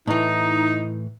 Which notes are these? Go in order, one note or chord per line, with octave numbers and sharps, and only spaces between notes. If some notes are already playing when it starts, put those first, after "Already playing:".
A2 E3 D#4